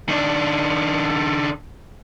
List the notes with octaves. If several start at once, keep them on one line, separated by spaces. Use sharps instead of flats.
D#3 D4